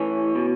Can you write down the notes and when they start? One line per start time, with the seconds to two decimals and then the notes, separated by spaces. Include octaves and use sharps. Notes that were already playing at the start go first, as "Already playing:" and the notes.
Already playing: A2 E3 C#4
0.35 B2